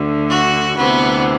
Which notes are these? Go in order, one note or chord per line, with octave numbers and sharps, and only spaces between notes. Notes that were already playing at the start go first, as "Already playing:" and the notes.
Already playing: D2 D3
F#4
D2 C3 E3 B3